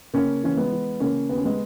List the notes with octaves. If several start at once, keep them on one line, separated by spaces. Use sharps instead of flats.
C#3 A#3 C#4
E3 C#4
G#3 B3
E3
C#3 A#3 C#4
D#2 B3
C#4
G#3 B3